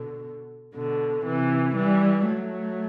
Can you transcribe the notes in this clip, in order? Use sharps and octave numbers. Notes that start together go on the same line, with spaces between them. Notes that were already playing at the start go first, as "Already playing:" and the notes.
Already playing: B2 D3
B2 D3
C3 E3
E3 G3
F#3 A3